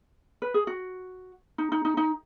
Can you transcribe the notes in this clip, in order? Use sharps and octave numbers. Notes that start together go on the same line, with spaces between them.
B4
G#4
F#4
D#4
D#4
D#4
D#4